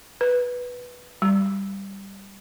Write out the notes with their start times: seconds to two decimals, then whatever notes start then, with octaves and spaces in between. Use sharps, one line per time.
0.21 B4
1.22 G3